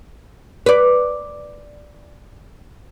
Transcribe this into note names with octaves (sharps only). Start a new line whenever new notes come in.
B4 D5